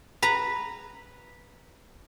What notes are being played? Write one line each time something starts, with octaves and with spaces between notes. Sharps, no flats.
B4 A#5